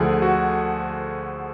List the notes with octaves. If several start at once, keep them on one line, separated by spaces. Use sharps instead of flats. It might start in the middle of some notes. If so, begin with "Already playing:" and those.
Already playing: D2 D3 F3 G#4
F#4